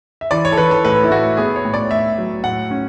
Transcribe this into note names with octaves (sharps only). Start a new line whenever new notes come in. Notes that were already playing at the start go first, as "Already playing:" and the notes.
E5
E3 D5
C#5
A4
E3 B4
A4
A2 B4
E4
A2 F#4
B3 G#4
C#5
A2
D5
A2 E5
F#3
A2 F#5
C#4